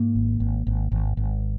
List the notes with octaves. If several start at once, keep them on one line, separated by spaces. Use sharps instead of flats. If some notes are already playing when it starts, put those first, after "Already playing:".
Already playing: G#2 A#3
G#1
G#1
G#1
G#1
G#1